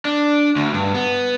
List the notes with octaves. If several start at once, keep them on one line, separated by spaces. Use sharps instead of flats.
D4
D2
G2
B3